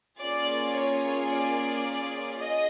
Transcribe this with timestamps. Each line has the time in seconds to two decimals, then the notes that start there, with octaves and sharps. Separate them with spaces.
0.21 A#3 C#4 F4 G#4 D5
0.75 C#5
1.30 D5
2.39 G#4 D#5